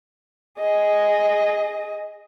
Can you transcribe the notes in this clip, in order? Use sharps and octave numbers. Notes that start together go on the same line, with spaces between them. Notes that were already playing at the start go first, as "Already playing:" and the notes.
G#4 D#5